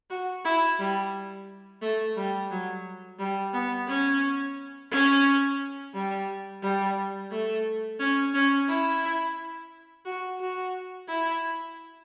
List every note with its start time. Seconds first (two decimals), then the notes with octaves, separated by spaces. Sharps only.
0.10 F#4
0.45 E4
0.79 G3
1.82 A3
2.17 G3
2.51 F#3
3.19 G3
3.53 B3
3.88 C#4
4.91 C#4
5.94 G3
6.62 G3
7.31 A3
7.99 C#4
8.34 C#4
8.68 E4
10.05 F#4
10.40 F#4
11.09 E4